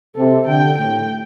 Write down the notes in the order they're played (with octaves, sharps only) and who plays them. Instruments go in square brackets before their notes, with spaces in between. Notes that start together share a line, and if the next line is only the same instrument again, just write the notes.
[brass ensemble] C3 [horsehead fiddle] A4
[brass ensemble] D3 [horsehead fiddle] G5
[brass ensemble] A2 [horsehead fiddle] G5